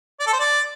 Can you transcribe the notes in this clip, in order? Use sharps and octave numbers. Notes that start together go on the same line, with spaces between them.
D5
A4
C5
D5